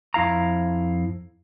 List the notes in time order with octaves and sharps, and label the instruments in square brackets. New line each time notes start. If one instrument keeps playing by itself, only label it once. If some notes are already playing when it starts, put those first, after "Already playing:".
[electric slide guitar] F2 E4 F5 A#5